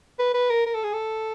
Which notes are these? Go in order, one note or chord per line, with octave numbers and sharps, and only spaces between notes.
B4
B4
A#4
A#4
A4
G#4
A4